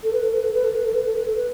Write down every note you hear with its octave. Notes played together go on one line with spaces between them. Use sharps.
A4
B4
A4
B4
A4
B4
A4
B4
A4
B4
A4
B4
A4
B4